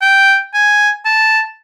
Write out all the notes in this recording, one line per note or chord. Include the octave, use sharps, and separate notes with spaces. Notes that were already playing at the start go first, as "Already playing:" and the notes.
G5
G#5
A5